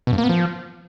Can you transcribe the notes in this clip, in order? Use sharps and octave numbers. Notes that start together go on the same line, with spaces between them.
B2
G2
A#3
B3
F3